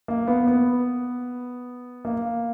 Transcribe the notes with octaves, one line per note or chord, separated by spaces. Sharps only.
A#3
B3
B3
A#3